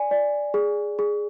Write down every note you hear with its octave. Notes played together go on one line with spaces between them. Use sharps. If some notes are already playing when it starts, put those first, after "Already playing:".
Already playing: D5 G#5
D5
G#4
G#4